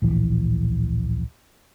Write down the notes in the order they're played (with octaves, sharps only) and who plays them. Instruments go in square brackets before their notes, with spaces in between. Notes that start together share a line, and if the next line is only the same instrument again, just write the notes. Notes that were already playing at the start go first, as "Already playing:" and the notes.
[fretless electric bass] D1 A#1 E3